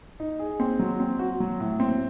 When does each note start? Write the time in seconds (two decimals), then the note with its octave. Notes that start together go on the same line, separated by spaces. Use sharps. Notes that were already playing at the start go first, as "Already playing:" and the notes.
0.20 D#4
0.39 G#4
0.60 C4
0.79 F#3
1.00 C4
1.19 F#4
1.40 F#3
1.60 A2
1.80 C4